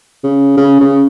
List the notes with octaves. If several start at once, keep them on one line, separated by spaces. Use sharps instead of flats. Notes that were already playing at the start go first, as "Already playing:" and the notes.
C#3
C#3
C#3